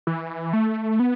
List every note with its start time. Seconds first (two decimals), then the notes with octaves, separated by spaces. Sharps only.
0.07 E3
0.53 A3
1.00 B3